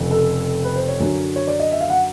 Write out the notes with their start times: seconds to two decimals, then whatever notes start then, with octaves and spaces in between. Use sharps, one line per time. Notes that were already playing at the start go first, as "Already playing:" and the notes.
Already playing: F1 F2 C#3
0.11 A4
0.64 B4
0.76 C5
0.88 C#5
1.00 F#2 D3 F#3
1.36 C#5
1.47 D5
1.60 D#5
1.72 E5
1.81 F5
1.90 F#5